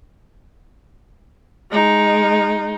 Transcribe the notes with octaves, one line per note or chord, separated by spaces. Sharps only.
G#3 D#4